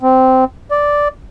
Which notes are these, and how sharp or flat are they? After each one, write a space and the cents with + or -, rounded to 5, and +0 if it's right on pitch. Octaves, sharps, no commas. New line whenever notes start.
C4 -10
D5 -5